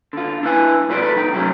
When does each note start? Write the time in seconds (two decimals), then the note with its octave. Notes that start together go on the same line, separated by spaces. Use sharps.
0.13 D3 F4
0.43 D4 E4 B4 G#5
0.89 F#2 C3 F4 B4 C#5 D5
1.02 C2 A4 B4
1.15 C#2 F3 D#4 G5
1.33 C3 F#3 G#3 A3 C#4